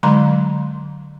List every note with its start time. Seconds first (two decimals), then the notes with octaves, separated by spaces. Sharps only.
0.03 D3 F#3 G#3 A#5 C6